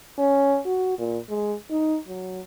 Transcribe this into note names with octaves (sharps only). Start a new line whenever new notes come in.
C#4
F#4
A#2
G#3
D#4
F#3